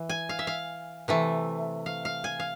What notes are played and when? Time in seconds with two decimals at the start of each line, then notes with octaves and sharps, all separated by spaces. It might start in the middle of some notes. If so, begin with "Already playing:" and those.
Already playing: E3
0.09 G#5
0.29 F5
0.39 E5
0.47 F5
1.08 C3 E3 A3
1.86 F5
2.05 F5
2.24 G#5
2.40 F5